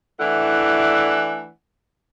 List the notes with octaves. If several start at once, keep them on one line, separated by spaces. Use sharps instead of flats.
E3 A3 D4 E4 F#5